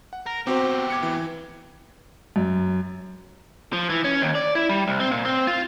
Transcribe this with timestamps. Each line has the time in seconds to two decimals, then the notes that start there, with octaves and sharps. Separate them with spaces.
0.13 F#5
0.26 A#4
0.47 B2 C4 F#4 G4 C5
0.90 D6 G#6 C#7
1.03 E3
2.36 F#2
3.73 F3
3.90 E3
4.04 C#4
4.22 D#2
4.35 D5
4.55 E4
4.69 G3
4.88 C2
5.00 C4
5.11 A#2
5.25 C4
5.47 F4